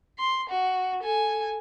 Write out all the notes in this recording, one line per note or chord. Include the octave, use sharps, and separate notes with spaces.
C6
F#4
A4 G#5